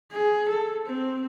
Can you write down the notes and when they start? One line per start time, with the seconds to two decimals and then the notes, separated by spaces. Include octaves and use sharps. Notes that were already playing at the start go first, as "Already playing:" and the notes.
0.12 G#4
0.48 A4
0.86 C4